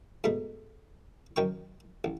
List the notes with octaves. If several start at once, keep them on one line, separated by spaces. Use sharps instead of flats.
G#2 B2 A3
F#2 D#3 G5 C#6
A1